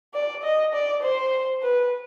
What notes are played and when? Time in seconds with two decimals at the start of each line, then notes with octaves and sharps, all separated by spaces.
0.14 D5
0.43 D#5
0.73 D5
1.03 C5
1.63 B4